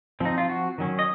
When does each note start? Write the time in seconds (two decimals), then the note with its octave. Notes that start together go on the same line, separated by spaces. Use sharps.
0.20 F3 C4 D#4
0.38 F4
0.50 F#4
0.78 D#3 F#3 C#4
0.99 D#5